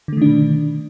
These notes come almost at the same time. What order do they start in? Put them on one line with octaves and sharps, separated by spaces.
D3 A3 D#3 D4 B2